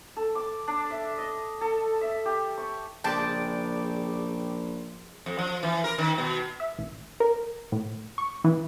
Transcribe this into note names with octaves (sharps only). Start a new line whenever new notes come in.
A4
D6
D4
E5
D#5
A4
E5
G4
C#6
A#1 C#3 G#3 D5 G5 A5 D6
F2
F3
E3
A#4
D#3
B2
E5
A1
A#4
A2
C#6
E3